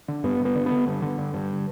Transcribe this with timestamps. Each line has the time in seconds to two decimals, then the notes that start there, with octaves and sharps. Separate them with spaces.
0.08 D3
0.24 G2 B3
0.40 G2
0.45 B3
0.55 D3
0.66 B3
0.71 D3
0.87 G2
1.02 D3
1.18 G2
1.34 G2